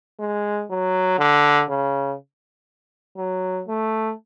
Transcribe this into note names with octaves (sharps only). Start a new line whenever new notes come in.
G#3
F#3
D3
C#3
F#3
A3